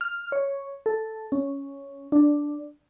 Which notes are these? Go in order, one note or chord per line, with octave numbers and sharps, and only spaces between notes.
F6
C#5
A4
C#4
D4